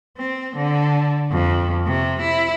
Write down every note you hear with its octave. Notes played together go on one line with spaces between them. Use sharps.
C4
D3
F2
C3
E4